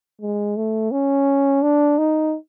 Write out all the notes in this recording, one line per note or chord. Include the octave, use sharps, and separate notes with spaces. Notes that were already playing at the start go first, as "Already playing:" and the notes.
G#3
A3
C#4
D4
D#4